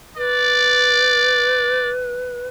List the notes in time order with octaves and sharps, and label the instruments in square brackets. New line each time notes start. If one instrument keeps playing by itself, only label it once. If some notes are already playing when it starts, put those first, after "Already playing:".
[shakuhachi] B4 [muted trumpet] D5